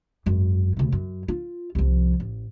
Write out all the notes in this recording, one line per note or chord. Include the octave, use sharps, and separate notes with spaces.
G#1 F#2
D2 C3
F#2
F4
C2 F3
A1